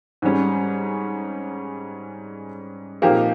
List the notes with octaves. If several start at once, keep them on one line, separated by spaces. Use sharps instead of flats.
G#2 G3 C#4
A#2 F3 A#3 D#4 G4